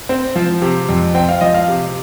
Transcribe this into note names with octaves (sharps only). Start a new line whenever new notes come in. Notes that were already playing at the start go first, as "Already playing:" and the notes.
C4
F3
C3
F2
C4 G5
F5
F3 D#5
F5
C3